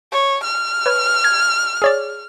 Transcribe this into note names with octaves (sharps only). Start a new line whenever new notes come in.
C#5
F6
B4 C#5
G#6
G#4 C#5 D5